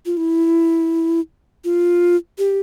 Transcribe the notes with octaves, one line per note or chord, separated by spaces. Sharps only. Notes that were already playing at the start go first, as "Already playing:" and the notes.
F4
E4
F4
G4